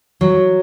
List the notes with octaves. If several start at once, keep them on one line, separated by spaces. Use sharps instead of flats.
F#3